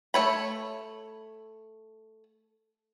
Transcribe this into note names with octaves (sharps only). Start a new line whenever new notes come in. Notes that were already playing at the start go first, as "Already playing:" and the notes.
A3 C#5 B5